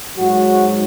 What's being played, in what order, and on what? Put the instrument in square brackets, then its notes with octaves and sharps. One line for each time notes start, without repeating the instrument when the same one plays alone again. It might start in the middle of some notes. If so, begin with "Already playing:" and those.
[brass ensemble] G#2 F#3 F#4